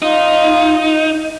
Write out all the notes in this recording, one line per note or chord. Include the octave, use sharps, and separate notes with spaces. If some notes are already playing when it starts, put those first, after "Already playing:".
D#4 F4